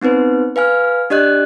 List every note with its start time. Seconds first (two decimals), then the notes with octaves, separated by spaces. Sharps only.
0.01 B3 C4 D#4 B4 C5
0.56 B4 F5 G#5 F6
1.10 D4 G4 D5 D#5 F#6